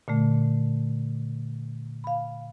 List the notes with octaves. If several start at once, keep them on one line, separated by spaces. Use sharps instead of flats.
A#2 D3 A3
F5 B5